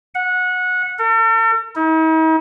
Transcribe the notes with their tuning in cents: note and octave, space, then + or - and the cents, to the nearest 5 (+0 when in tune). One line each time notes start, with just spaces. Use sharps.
F#5 -20
A4 +45
D#4 +45